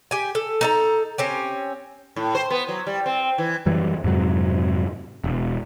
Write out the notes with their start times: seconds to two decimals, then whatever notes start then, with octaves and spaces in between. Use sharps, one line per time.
0.11 G4 G#5
0.35 A4
0.61 D#4 A4 A#5
1.18 C4 C#4 G4
2.16 A2
2.35 C5
2.51 B3
2.68 F#3
2.87 G3
3.06 C4
3.38 E3
3.66 F#2 E3 G3
4.04 F2 G#2 C3 F#3
5.24 E1